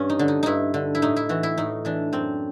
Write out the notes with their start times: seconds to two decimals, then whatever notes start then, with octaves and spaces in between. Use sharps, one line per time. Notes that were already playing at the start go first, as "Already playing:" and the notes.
Already playing: G2 C#4
0.10 D#4
0.19 D3
0.28 D#4
0.43 G2 D#4 E4
0.74 D3
0.95 E4
1.02 A2 D#4
1.16 E4
1.29 E3 F#4
1.43 E4
1.57 A2 D#4
1.85 E3 D4
2.13 F#2 C4